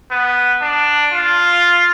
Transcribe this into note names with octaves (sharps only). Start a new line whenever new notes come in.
B3
D4
F4